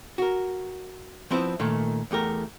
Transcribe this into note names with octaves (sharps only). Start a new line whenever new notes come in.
F#4 A#4
F3 B3 C4 E4
A#2 D#3 A3
E2 A3 G4 A#4